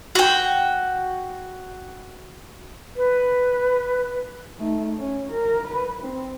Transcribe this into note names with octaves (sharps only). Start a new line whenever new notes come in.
F#4 G5
B4
A3 D#4
C#4
A#4
B4
C4